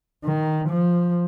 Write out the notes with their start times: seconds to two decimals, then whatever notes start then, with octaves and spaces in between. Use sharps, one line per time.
0.24 D#3
0.69 F3